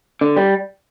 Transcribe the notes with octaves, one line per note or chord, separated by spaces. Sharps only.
D3
G3